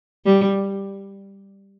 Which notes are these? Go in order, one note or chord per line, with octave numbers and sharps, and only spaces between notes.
G3